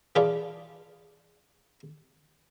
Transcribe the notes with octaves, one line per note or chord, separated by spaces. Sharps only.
E3 F4 G#4 A4 D5